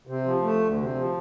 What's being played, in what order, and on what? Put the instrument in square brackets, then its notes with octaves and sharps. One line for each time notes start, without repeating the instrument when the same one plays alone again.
[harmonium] C3
F3
A3
D2
C3
F3